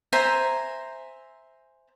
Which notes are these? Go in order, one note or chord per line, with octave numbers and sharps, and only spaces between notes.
C5 E5 G#5 A#5